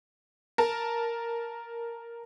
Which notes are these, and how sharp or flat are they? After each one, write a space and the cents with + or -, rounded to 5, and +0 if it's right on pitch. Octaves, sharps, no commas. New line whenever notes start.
A#4 +0 A5 +0